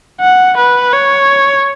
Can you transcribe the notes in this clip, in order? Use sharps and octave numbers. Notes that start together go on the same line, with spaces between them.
F#5
B4
C#5